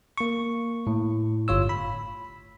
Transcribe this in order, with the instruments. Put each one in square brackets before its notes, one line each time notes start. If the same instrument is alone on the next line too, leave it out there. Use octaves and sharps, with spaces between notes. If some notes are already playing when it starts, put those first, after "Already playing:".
[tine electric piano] A#3 C#6
A2
G1 F4 C#5 E6
B5